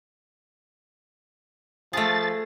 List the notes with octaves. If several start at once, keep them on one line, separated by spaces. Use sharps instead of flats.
F3 A3 G#4 A6